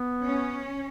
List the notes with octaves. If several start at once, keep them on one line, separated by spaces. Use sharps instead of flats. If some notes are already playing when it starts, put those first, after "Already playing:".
Already playing: B3
C#4